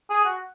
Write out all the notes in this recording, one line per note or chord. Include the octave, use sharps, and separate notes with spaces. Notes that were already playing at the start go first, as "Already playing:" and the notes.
G#4
F#4